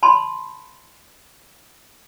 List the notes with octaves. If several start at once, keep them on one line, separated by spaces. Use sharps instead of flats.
A5 B5 C6